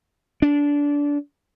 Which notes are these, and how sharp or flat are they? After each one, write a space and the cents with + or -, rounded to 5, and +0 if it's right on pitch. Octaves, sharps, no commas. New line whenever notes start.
D4 -20